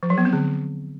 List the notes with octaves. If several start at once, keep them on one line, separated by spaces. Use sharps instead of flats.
F3
F#3
B3
C4
D3